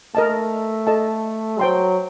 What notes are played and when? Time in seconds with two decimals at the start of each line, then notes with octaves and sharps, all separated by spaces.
0.15 A3 A#4 D#5 A5
0.87 A4 D#5 A5
1.59 F#3 C5 G5 C6